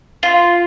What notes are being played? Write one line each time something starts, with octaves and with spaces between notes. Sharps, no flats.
F4